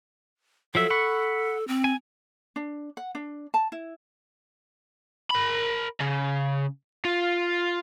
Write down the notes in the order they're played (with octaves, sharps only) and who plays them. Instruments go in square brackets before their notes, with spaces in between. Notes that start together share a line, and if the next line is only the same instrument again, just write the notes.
[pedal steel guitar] F3 F#3 E5 [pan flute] A4
[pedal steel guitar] F#5 B5 C#6
[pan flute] C4
[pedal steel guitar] G#5
[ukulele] D4
F#5
D4
A5
E4
[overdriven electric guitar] A#4 B5
C#3
F4